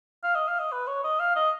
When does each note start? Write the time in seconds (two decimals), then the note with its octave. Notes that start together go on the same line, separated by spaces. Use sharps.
0.23 F5
0.35 D#5
0.48 F5
0.59 D#5
0.72 B4
0.87 C#5
1.04 D#5
1.20 F5
1.36 D#5